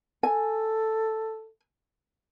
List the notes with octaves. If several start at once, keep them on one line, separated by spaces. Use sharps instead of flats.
A4 G#5